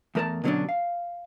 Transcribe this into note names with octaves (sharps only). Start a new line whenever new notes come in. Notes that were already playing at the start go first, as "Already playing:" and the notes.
E2 A3 A#4 C5 A5 A#5
B2 D3 F#3 A#3 C#4 D4
F5